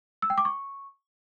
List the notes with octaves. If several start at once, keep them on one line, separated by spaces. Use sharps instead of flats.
E6
G5
D6
C#6